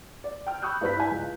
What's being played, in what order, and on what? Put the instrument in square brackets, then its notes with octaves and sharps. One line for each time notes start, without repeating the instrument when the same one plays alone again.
[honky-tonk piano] D5
G5 F6
B5 C#6 D#6 E6 F#6 G6
G2 G3 B4 B5 B6
E4 G#5
C#2